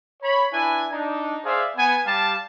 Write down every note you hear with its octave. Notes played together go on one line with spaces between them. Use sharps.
C#5 B5
D4 E4 B4 G#5
D4 D#4
G#4 C5 D5 E5 F5
B3 G#5
G3 G4 F5 A5